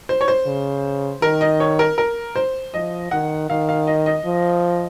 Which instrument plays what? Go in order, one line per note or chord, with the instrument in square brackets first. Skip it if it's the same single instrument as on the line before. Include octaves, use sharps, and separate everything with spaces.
[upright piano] C5
C#5
C5
[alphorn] C#3
[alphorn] D#3 [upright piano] A#4
[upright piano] D#5
C#5
A#4
A#4
C5
[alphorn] F3 [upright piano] D#5
[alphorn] D#3 [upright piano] F#5
[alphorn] D#3 [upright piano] F5
[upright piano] F5
D#5
D#5
[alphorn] F3